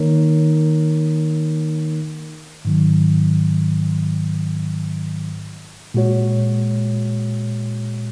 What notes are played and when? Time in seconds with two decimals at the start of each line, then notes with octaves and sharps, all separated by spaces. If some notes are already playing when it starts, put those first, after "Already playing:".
Already playing: D#3 A#3 D#4 A#4 C#5
2.65 G#2 D#3 F#3
5.94 A#2 G#3 F#4 C#5